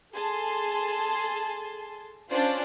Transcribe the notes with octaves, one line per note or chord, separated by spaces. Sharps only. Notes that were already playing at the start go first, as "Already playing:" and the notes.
G#4 A4 A5 C6
C#4 D4 F4 C5 D5